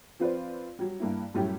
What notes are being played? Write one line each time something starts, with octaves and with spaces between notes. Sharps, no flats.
F3 C4 F4 B4 C5 D5
F#3 G3
G2 A#3 E4
F#2 A2 G3 C#4 E4 G4